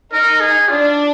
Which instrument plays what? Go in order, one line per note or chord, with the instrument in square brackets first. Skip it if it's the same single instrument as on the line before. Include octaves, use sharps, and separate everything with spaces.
[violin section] D#4 [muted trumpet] A#4
[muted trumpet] G#4
[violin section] D4 [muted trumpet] F4